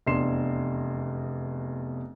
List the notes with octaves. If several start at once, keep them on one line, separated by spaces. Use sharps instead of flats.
F1 E2 D4 C6 C7 E7